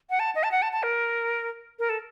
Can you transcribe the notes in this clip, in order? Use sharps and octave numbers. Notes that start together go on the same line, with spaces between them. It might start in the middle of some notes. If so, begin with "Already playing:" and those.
F#5
A5
D#5
A5
F#5
A5
A5
A#4
A#4
A4